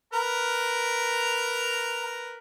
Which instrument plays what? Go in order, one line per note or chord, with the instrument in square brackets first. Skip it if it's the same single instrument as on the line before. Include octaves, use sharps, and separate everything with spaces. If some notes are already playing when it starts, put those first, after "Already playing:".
[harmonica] A#4 B4 A#5